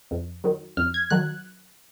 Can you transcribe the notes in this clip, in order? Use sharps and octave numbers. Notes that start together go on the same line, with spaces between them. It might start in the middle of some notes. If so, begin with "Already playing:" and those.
F2
D#3 F#3
F2 F6
G#6
D#3 F#3 F#6